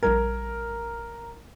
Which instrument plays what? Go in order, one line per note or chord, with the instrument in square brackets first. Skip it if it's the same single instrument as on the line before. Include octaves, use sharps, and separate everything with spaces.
[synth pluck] A#1 G3 G#6 [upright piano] A#4